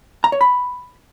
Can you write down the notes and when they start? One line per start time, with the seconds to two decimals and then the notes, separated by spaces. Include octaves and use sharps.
0.24 A#5
0.32 C#5
0.41 B5